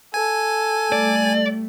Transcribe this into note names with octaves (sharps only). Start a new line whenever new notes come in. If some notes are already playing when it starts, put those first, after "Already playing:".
A4 G#5
G3 A3 D5